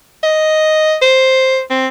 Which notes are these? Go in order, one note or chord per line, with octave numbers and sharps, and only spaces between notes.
D#5
C5
C4